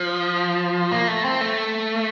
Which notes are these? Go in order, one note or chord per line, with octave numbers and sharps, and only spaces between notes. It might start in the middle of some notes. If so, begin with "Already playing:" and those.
Already playing: F3
A#3
A3
C4
A3